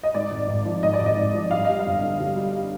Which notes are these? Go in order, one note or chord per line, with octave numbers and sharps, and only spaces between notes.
D#5
G#2 D5
G#1
G#1
F3
G#2 D#5
D5
G#1
D#5
G#1
F3
G2 F5
G3 D#5
F5
G1
D3
G2
G3